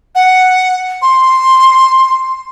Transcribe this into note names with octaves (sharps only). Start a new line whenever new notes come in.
F#5
C6